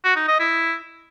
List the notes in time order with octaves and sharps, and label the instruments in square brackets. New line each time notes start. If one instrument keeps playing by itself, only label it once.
[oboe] F#4
D#4
D#5
E4